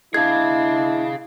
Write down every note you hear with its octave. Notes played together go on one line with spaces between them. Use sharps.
G#3 A#3 D4 E4 G#4 F5 G#6